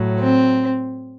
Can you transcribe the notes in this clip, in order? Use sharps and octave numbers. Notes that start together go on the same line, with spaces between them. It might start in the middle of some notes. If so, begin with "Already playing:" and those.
Already playing: A2 F#3
C4